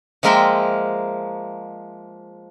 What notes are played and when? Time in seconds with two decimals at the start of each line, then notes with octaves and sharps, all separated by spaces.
0.23 F3 G#3 A#3 A#4 E5 G5